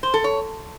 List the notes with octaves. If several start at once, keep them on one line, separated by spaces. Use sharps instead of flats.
C5
A4
C#5